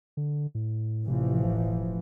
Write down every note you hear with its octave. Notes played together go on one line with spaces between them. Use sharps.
D3
A2
A1 C3 E3 F3
E1